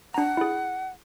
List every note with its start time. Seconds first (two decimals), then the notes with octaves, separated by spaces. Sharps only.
0.14 D4 F#5 A#5
0.37 E4 G#4